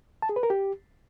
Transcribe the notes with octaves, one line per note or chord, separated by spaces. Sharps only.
A5
G#4
B4
A#4
G4